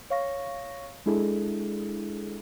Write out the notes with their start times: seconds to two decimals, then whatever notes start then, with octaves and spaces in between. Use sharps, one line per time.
0.10 C#5 F5 C#6 A#6
1.06 G#3 D4 E4 G#4 A4